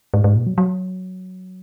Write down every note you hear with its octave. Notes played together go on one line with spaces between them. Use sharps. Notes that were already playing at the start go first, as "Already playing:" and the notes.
G#2
G#2
A#2
F#3
F#3